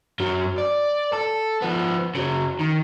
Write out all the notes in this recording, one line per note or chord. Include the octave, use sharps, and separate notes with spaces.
F#2 F#3
D5
A4
F3 B3
C#3 F#3
D#3